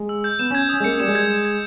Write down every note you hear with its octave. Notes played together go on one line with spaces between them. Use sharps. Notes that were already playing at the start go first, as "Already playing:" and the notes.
Already playing: G#3
E6
G6
B3 E7
C#4
G#6
C#4 D#6
G#3
A#3 C#7
G3 E7
G#3
G#6
E7
G#6